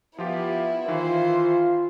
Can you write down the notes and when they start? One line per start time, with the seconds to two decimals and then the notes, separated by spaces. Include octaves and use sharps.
0.18 F3 B3 E4 F4 G4
0.88 D#3 E3 F4 C5 C6